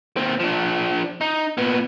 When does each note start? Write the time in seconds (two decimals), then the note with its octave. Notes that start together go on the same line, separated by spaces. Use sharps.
0.17 D#2 C4
0.40 F3 D4
1.21 D#4
1.57 A#2 B3